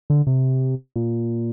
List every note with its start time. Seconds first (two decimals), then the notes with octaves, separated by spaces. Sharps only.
0.10 D3
0.27 C3
0.96 A#2